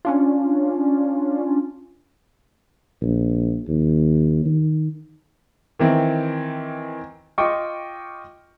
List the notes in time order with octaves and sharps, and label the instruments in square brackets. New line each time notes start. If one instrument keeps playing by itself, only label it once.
[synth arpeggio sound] C#4 D4 F4
[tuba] A#1
D#2
D#3
[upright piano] D#3 E3 C4
F4 D#5 G5 C#6 D6